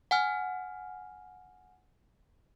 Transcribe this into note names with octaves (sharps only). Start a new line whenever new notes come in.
F#5 G#5 F6